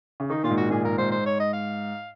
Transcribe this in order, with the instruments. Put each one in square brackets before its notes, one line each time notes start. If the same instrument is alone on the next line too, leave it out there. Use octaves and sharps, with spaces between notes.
[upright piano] C#3
[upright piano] D#3 [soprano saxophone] D#4
[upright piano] A#2 [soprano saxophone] F4
[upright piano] G#2
[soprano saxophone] F#4
[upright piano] A#2 [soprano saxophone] G#4
[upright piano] G#2 [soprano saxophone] A#4
[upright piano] G#2 [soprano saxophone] C5
[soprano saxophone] C5
C#5
D#5
F5